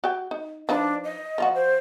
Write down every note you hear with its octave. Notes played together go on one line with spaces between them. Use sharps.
F#4 G5
D#4
F3 D4 D#4 B4
D#5
F3 F4 F#4
C5